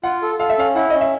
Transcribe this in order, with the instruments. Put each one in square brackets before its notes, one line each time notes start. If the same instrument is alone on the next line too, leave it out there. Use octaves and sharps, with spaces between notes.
[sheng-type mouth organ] F4 [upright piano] F#5
[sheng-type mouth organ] A4
[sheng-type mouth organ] A4 [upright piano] F5
[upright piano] E5
[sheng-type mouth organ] C#4 [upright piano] F5
[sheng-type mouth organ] E4 [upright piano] F#5
[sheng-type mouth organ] C#4 [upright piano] D#5
[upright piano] E5